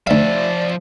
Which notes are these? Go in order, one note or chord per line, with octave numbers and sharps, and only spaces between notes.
D2 F3 D5 E5 F5